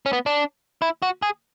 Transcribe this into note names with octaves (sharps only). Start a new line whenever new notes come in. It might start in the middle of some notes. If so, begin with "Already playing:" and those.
C#4
B3
D4
E4
F#4
G#4